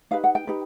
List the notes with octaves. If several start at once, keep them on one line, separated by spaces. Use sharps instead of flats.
D#4 G4 B4 F5
F#5
G5
D#4 G4 B4